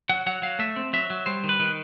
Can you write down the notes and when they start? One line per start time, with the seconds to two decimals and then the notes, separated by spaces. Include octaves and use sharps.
0.09 F#3 F#5
0.27 F#3 F#5
0.42 F#3 F5
0.59 A3 E5
0.76 C4
0.93 F#3 E5
1.10 F#3
1.26 G3 C5
1.44 D#3
1.49 B4
1.60 D#3